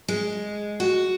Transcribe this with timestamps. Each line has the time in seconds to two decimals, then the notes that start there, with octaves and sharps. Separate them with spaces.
0.08 G#3
0.80 F#4